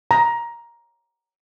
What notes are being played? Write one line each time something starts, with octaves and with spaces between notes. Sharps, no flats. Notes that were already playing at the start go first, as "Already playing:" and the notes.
A#5